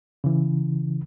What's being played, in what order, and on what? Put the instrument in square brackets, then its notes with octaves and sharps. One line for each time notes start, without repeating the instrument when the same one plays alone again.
[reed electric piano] C#3 E3